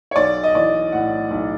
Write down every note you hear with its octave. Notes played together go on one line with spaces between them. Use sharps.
C#5
B1 D5
D#5
E3 D5
A2 F#5
B1